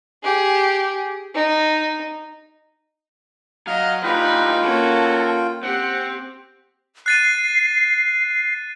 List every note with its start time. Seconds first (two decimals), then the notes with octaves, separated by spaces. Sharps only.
0.23 G4 G#4
1.34 D#4
3.67 F#3 D#5 F5 F6
4.04 E3 G3 D#4 F4 B4 G5
4.64 A#3 C#4 F#4 A4
5.63 C4 G4 F#5
7.06 F#6 A6 C7 D#7